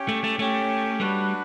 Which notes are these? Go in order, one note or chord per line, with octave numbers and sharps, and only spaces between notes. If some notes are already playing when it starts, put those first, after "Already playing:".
Already playing: C#4 G4 C#5 G5
A3
A3
A3 C#4 G4 C#5 G5
G3 D4 F#4 B4